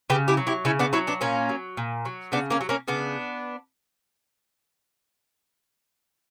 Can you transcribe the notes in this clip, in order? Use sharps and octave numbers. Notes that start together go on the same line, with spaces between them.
C#3 G4 B4
E4 G4
F#3
E4 G4
C#3 C#4 E4
B3 D4
F#3 C#4 E4
B3 D4
A#2 A#3 C#4
F#3
A#2
F#3
C#3 B3 D4
A#3 C#4
F#3
A#3 C#4
C#3 B3 D4